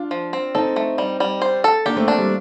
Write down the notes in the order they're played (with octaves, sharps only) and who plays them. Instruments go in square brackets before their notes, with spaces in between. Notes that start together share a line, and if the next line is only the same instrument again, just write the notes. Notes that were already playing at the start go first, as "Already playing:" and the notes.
Already playing: [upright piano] D4 F4
[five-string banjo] F3
C4
[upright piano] C4 D#4 [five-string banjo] A4
[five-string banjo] A3
G3
G3
C5
A4
[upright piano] A#3 D4 [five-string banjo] G4
[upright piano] A3 C4
[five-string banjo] D4
[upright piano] G3